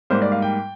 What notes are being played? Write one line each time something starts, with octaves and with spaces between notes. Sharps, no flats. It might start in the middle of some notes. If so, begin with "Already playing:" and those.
G#2 G3 A#3 C5
D5
F5
G5